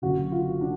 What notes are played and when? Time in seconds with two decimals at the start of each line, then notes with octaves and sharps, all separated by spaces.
0.02 F#1 F#2 D3 F#4
0.32 F4
0.61 D4